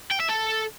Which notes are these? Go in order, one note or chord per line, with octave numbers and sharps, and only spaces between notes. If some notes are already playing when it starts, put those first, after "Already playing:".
G5
E5
A4